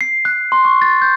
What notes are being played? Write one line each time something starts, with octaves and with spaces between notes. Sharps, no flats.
C7
F#6
C6
C#6
A6
G6